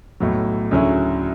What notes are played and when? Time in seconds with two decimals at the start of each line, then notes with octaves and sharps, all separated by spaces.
0.20 B1 A2 F#3
0.71 D2 C#3 F#3 C#4 E4